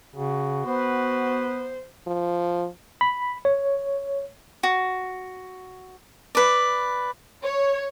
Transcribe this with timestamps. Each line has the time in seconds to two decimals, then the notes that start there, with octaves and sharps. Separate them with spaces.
0.16 C#3 F#4
0.66 B3 B4 C5
2.07 F3
3.01 B5
3.45 C#5
4.63 F#4
6.35 B4 D5
7.43 C#5